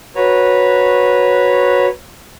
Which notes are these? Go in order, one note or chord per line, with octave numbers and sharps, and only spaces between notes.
F#4 B4 C#5 A#5